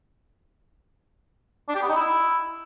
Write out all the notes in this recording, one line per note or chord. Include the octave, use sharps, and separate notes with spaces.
D4
G4
B3
D#4
E4